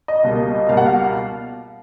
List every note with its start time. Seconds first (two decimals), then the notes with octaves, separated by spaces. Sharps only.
0.08 D#5
0.23 C#2 B2 G3 A#3
0.69 C#2 B2 G3 A#3 F5
0.77 F#5
0.86 F5